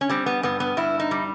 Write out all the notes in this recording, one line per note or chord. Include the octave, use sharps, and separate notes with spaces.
C#4
G3 C4
B3
G2 B3
B3
G2 E4
D#4
G3